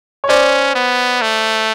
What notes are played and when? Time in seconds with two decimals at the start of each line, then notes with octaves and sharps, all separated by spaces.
0.24 C#5
0.29 C#4 C5 D5
0.75 B3
1.22 A3